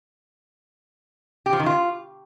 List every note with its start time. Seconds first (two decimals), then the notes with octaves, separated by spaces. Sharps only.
1.46 G4
1.53 F3
1.60 D#3
1.66 F4